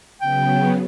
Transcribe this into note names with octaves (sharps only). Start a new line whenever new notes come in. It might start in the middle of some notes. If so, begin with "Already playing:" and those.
C#3 F#3 B3 G5